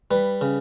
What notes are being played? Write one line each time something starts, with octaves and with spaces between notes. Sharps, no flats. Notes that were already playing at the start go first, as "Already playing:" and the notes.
G3 B4
C#3